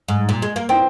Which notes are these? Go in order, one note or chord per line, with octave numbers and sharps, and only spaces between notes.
G#2
A#2
G#3
A#3
C4 G5